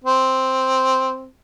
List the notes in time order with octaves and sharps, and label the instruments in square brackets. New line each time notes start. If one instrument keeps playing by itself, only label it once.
[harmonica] C4